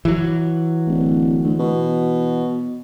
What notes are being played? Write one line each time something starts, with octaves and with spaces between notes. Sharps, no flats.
E3 F#3
D1
D2
B2